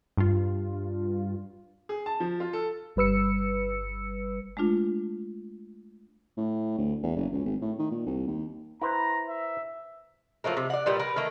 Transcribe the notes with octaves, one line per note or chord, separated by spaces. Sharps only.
G2 F4
G#4
A5
F3
F4
A4
G1 G3 B4 E6 C#7
G#3 A3 D4 F4
A2
D2
E2
F#1
C#2
G#1
A2
D#3
A#2
C2
D#2
E4 B4 C5 A#5
E5
F3 F#3 A3 A#3
C3
D5 F#5
A#2 G3 B3
A#4 B4
D#3 A3 A#3